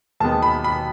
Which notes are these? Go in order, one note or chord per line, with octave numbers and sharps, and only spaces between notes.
D#2 D#3 G#3 B3 A5
B5
B5